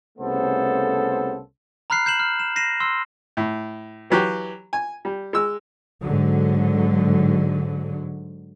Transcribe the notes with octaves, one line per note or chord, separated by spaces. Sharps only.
C2 C#3 A3 B3 A4 C5
A#5 B5 F6 F#6 C7
G6 C7 E7 F#7
F6
E7
A#6 C7 D#7 E7
C6 E6 C7
A2
E3 F#3 G4
G#5
G3
G#3 E6
G#2 D3 F#3